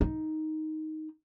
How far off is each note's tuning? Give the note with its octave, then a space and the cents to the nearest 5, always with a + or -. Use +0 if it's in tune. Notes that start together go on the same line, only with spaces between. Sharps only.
D#4 +5